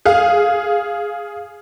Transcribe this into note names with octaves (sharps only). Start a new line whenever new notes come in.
G#4 F5